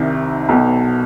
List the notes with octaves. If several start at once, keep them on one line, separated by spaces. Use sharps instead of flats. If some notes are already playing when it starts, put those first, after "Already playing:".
Already playing: C2 C3 D#3
B1 B2